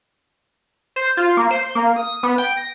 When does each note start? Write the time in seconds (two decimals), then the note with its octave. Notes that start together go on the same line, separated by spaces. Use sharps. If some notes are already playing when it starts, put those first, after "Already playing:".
0.96 C5
1.17 F4
1.37 A#3
1.51 C5
1.63 C6
1.75 A#3
1.96 D#6
2.23 B3
2.38 G5
2.57 A#6